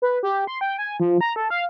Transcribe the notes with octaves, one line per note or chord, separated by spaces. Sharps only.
B4
G4
C6
G5
G#5
F3
A#5
A4
F5